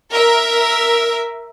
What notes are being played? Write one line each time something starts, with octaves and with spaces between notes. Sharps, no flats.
A#4 E5